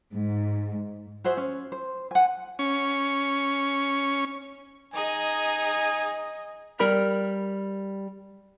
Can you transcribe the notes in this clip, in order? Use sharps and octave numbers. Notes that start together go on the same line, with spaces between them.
G#2
F#4 G#4 C5 E5
C#4
C5
F#5 G#5
C#4 C#6
D#4 G#4 D#5 G#5
G3 A#4 B5